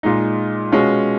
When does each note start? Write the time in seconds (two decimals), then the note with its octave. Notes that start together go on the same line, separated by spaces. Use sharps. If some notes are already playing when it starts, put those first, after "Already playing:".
0.03 A#2 G#3 D#4
0.72 B2 G#3 C#4 F4